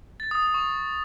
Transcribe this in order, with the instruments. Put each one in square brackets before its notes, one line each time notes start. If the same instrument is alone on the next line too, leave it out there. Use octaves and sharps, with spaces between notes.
[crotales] A6
D#6
D#6
C#6